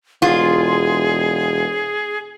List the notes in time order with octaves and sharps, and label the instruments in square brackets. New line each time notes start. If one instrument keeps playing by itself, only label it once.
[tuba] E1 [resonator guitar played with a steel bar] F4 [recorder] G#4